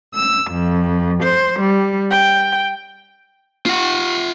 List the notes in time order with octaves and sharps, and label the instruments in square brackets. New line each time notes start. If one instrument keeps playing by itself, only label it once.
[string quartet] E6
F2
C5
G3
G5
[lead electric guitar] F4 F#5